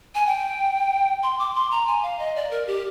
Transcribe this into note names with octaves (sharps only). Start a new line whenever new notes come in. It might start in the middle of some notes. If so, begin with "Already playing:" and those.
G#5
G5
C6
D6
C6
A#5
G#5
F5
D#5
D5
A#4
G4